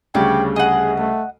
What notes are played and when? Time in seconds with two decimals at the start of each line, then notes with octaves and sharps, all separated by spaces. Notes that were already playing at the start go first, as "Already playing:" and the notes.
0.15 D2 C#3 G3 C#5 D5 G5
0.56 G#4 D#5 F#5
0.98 A3